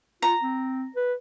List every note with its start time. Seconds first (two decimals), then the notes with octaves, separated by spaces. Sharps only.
0.22 F4 A#5
0.42 C4
0.96 B4